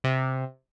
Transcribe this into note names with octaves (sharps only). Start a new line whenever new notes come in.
C3